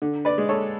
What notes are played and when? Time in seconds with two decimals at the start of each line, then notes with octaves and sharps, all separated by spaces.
0.02 D3
0.25 B4 D5
0.38 G#3
0.49 A4 C#5